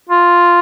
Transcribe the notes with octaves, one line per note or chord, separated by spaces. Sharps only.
F4